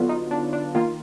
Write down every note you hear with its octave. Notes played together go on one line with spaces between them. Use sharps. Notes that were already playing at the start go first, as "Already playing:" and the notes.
Already playing: D3 F#3 B3 F4
D#4
D4
D4
D#3 A#3 F4